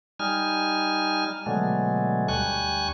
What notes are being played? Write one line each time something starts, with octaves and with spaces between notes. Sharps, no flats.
G3 D#4 G#5 F6
B2 D3 F#3 G#3 A3
D2 G3 G#5 C#6 F#6